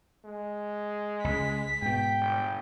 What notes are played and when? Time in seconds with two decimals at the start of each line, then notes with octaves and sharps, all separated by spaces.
0.25 G#3
1.24 C#2 B6
1.82 G#2 B2 G5
2.20 G1